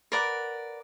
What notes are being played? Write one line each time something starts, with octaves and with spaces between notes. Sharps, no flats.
A#4 B4 D5 F#5